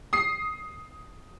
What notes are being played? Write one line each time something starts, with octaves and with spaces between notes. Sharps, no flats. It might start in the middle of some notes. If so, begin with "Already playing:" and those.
D#6 C7